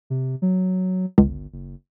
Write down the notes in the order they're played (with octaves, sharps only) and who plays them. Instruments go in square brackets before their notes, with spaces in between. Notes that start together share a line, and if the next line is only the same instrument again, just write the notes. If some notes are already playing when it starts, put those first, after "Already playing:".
[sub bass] C3
F#3
[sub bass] G1 [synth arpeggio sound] C#2
[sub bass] F#1